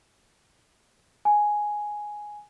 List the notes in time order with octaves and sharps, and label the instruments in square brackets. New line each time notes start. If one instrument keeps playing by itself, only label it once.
[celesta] G#5